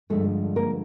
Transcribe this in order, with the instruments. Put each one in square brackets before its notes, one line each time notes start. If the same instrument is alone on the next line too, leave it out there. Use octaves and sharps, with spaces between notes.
[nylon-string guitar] G2 D3 F3 G#3 A3 A4
A#3 A#4